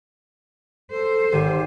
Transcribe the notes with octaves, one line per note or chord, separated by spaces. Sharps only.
A4 C5
G#1 D#3 G4 D#7